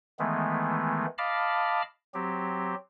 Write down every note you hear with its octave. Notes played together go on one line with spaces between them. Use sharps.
D#3 E3 G#3 A3 B3
D#5 F5 A5 B5 D6 F6
F#3 C4 G4